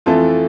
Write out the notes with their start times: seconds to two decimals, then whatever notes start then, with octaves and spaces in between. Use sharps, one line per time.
0.06 F2 E3 A3 F4 A4